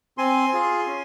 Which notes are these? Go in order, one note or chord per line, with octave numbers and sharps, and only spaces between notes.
C4 G#5 C6
F4 G#4
C#4